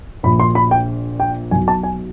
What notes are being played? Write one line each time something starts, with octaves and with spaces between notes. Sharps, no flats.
A#1 A#2 B5
C6
B5
G5
G5
B1 B2 G#5
A5
G#5